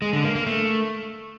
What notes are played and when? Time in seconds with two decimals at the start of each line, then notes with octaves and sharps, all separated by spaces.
0.02 G#3
0.13 D3
0.24 A#3
0.35 A#3
0.46 A3